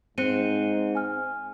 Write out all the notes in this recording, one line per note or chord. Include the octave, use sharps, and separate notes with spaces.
G#2 C4 F#6 C#7 D#7
G#5 F6